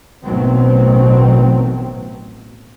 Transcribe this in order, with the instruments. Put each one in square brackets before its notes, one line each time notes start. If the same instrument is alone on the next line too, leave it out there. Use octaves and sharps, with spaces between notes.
[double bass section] A1 B2 D#3 F#3 C4